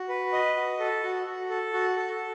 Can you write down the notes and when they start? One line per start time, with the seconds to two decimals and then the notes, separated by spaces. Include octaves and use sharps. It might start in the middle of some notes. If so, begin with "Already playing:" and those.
Already playing: F#4
0.09 B4
0.33 D#5
0.56 F#4
0.80 A4
1.03 F#4
1.26 F#4
1.50 A4
1.73 F#4
1.96 A4